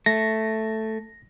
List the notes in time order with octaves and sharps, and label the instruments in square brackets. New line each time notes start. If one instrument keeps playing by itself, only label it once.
[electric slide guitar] A3 [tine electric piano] A#6